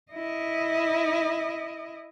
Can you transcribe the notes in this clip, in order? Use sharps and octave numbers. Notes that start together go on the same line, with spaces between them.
E4 D#5